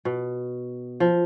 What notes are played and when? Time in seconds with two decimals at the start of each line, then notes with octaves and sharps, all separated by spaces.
0.05 B2
1.00 F3